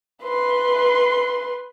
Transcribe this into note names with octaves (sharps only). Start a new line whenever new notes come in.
B4 C6